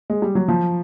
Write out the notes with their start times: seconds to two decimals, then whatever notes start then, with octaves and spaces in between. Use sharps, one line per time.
0.10 G#3
0.22 G3
0.35 F#3
0.48 F3